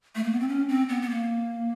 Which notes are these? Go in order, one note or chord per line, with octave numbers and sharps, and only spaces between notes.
A3
A#3
B3
C4
C#4
C4
B3
B3
A#3